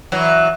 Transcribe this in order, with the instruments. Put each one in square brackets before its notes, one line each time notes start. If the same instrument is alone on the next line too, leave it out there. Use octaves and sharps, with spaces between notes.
[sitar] E3 F#3